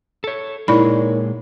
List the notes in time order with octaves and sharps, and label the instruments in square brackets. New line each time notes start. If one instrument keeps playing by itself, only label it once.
[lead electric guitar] A4 C#5
[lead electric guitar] A#2 G#3 [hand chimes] D#4 A#4 C#5 [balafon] E4 D5 B5